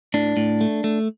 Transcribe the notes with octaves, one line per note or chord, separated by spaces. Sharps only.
A2 D4
A2
A3
A3